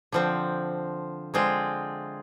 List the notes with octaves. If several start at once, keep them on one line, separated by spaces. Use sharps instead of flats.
D3 F3 C4
D3 G#3 C4 F4